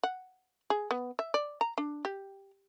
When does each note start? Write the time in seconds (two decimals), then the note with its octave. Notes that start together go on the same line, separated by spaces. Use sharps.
0.03 F#5
0.70 G#4
0.91 B3
1.19 E5
1.34 D5
1.61 A#5
1.78 D4
2.05 G4